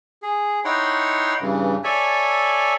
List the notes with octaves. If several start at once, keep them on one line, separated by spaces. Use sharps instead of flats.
G#4
D#4 E4 C#5 F#5 G5 C6
G2 C#3 E3
A4 C#5 D5 E5 G#5